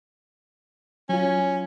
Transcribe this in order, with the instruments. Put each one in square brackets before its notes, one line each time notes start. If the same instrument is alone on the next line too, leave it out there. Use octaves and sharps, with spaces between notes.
[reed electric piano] F#3 F4 [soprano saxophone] C#4